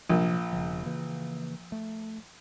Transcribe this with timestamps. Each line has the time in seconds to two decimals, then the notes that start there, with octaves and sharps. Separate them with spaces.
0.09 A#1 C3 F3 F#3
0.53 E1 C#3 F3
0.86 C#3 E3 A#3
1.72 A3